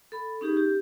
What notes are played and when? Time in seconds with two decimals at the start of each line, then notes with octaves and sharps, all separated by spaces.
0.12 A4 B5
0.41 C#4 D#4 G4 G#4
0.57 G4